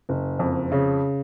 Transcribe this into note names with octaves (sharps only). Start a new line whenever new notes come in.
F#1
F2
C#3